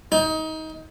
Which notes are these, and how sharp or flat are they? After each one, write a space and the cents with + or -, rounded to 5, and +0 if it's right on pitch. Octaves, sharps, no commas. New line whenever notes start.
D#4 +25